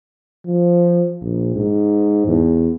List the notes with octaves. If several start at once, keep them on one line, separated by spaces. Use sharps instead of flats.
F3
A#1
G#2
E2